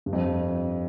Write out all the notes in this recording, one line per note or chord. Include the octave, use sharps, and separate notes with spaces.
G2
F2